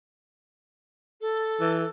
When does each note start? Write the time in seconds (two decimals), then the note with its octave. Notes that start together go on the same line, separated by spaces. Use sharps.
1.21 A4
1.60 E3